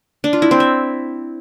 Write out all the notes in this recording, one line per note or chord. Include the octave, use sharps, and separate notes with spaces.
D4
F4
E4
C4
E5